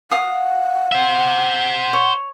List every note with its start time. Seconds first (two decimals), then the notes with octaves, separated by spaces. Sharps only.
0.11 F5 F#5 D#6
0.92 C5 E5
1.93 C#5